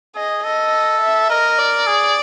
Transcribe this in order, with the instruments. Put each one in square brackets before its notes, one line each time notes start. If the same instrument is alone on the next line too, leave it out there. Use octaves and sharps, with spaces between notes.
[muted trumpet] G#4 [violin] D#5
[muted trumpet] A4 [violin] D#5
[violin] E5
[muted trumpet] A#4 [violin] D#5
[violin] D5
[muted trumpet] G#4